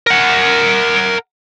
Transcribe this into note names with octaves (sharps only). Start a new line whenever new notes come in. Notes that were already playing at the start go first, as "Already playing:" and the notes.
A#4 F#5